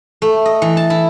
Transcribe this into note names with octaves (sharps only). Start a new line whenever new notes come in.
A3
D#5
E3
A5
E4